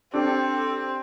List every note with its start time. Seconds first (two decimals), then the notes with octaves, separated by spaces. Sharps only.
0.14 C4 D4 G4 A4